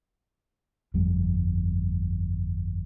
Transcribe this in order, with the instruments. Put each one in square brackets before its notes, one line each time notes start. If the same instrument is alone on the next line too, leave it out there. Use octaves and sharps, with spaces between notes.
[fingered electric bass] G1 F2 G3